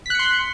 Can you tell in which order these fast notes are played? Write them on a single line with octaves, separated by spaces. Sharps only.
B6 F#6 C#7 C6